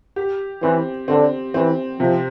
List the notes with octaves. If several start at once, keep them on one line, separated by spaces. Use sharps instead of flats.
G4
E3 C4
D3 C4
E3 C4
C3 F3